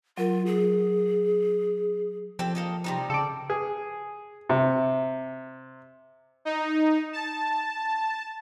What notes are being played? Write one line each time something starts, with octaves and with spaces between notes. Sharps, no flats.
F#3 F4 A#4
G#4
F3 C4 G4 A4
A#3 A4 D#5
C3 G3 D#4
C#3 A4 D5
G#4
C3
D#4
A5